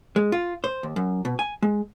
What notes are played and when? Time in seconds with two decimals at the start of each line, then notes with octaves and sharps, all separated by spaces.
0.16 G#3
0.32 F4
0.64 C5
0.83 D#2
0.96 F#2
1.25 B2
1.39 G#5
1.62 G#3